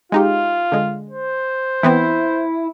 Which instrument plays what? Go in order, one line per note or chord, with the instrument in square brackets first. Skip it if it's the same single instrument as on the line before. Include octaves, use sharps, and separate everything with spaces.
[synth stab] G#3 D#4 G4 [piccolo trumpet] F4
[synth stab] D3 G#3
[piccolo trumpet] C5
[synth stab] E3 B3 C4 [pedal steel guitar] E4